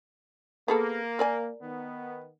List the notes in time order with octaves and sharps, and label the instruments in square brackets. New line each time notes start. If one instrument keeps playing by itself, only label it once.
[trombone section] A#3 [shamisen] B3 G#4 A4
[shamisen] A#4 D5 G#5
[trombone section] D#3 B3